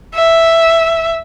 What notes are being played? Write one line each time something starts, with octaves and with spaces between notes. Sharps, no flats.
E5